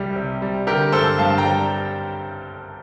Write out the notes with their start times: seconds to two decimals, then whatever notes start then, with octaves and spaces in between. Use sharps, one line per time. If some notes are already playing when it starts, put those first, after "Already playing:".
Already playing: C2 G3
0.16 C3
0.42 G3
0.67 D3 G4 A#4
0.92 G2 A4 C5
1.18 G2 F5 A5
1.38 G5 A#5
1.44 G3